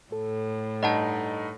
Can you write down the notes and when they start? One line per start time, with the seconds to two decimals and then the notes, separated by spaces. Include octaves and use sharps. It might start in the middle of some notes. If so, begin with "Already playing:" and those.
0.12 A2 A4
0.83 G2 D#4 D#5 F#5 A5